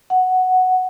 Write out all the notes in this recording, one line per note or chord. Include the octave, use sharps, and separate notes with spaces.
F#5